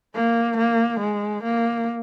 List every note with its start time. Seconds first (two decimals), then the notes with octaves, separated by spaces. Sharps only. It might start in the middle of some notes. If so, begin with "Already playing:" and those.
0.15 A#3
0.58 A#3
1.00 G#3
1.44 A#3